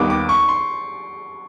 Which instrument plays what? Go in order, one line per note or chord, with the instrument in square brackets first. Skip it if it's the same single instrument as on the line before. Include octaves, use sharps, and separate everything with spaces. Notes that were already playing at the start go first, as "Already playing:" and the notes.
Already playing: [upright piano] D#2 D#3 G3 B3 [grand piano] D6
[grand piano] D6
C#6
C6